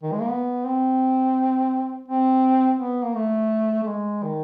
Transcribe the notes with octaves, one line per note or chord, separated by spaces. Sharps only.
D#3
G#3
A#3
B3
C4
C4
B3
A#3
A3
A3
G#3
D#3